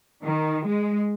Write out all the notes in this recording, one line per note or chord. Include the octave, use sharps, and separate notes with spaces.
D#3
G#3